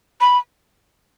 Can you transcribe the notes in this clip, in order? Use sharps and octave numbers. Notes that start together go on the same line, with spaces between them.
B5